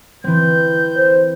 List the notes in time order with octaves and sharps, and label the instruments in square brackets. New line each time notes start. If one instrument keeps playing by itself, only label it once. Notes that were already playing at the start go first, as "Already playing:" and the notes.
[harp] E3 C4 [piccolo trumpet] G6
[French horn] C5